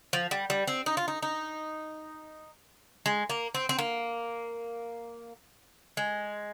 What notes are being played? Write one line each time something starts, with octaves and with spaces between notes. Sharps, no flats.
F3
G3
G3
C4
D#4
F4
D#4
D#4
G#3
A#3
C4
C4
A#3
G#3